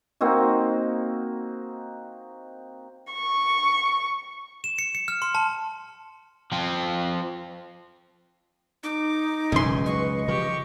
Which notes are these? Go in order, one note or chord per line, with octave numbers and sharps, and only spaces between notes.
A#3 C4 D#4 F#4
C#6
E7
C#7
C#7
F6
C6
A5
F3 C4
D#4 D6
E1 C#2 F#2 G#5 C6
F#3 B4 D#5 C#6
C#3 F3 G4 C#6